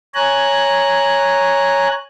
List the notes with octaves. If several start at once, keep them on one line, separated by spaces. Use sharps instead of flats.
C#5 G#5 A#5 F#6